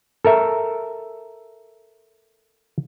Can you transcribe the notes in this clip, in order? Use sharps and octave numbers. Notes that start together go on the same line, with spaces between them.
A4 A#4 E5